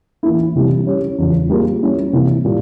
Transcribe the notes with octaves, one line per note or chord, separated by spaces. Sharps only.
E3 A#3 E4
C3 E3 G3
G3 C#4 G4 C#5
E2 C#3 F3
G3 A#3 F4 G#4
G3 C#4 E4
C3 E3 A#3 E4
A#2 G3